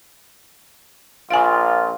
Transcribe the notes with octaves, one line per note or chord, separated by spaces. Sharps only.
A#1 F4 F5 G#5